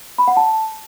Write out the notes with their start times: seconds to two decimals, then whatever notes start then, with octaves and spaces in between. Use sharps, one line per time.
0.18 B5
0.28 F#5
0.37 A5